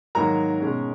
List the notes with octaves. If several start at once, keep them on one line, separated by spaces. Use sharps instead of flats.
G#2 D#3 F#3 A#3 D#4 A#4 A#5
B2 G#3 C#4